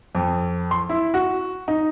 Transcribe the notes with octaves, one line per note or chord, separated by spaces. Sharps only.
F2
C6
E4
F#4
D#4